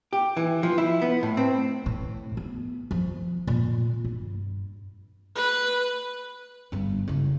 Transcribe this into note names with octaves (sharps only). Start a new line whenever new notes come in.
G4
E3
F3
E4
B3
A2
C4
A2
B3
F3
A#2
G2
B4
G1 G2
F#1 C#3